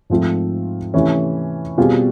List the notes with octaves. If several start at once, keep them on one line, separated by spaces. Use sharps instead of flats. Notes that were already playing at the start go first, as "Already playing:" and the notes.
G#2 F3 A3 C4 F4
C3 E3 A3 C#4 E4
B2 G3 C4 F4 G#4